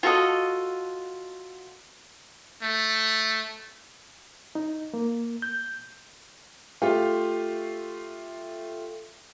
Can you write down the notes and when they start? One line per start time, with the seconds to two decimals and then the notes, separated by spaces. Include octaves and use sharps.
0.03 F4 F#4 A4 D#5
2.62 A3
4.55 D#4
4.94 A#3
5.42 G6
6.82 A3 F4 G4 F5